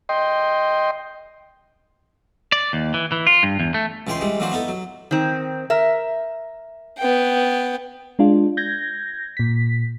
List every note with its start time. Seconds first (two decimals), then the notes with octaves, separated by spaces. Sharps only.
0.09 D#5 G5 C6
2.52 D5
2.73 D#2
2.94 E3
3.12 E3
3.27 F4
3.43 G2
3.60 E2
3.74 A3
4.07 C#2 E3 G#3 G5 G#5 C6
4.21 E3 G3 G#3
4.40 E3 F#3 A#3 D4 F#4 C5
4.52 B3 D#4 E4 A4
4.68 F#3
5.11 D#3 C4
5.70 A#4 E5
6.98 B3 G5
8.19 G#3 D4 F4
8.57 G6 G#6 A#6
9.37 A#2 B6